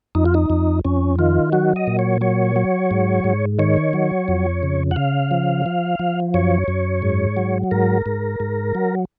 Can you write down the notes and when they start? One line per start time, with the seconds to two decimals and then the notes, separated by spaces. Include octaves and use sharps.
0.15 F2 D#4
0.26 F4
0.34 D#4
0.50 F2
0.85 F2 C#4
1.19 D#3 F4
1.52 F#3 F#4
1.76 D#5
1.87 A#2
1.99 C#5
2.21 F#3 C#5
2.56 F#3
2.91 G#2
3.24 G#2
3.59 D#3 C#5
3.93 F#3
4.28 F2
4.63 C#3
4.91 F#5
4.96 C#3 F5
5.31 F3
5.66 F3
5.99 F3
6.34 F#2 C#5
6.68 F#2
7.02 G#2
7.37 F#3
7.71 G#2 A#4
8.06 G#2
8.40 G#2
8.75 F#3